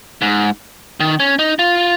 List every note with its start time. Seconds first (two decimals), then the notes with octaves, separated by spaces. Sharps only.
0.22 G#2
1.00 D#3
1.20 C#4
1.39 D#4
1.59 F4